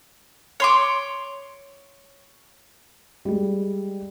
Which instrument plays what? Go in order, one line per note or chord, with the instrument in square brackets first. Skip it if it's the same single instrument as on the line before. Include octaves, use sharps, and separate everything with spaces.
[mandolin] C#5 C6 D6
[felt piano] G3 G#3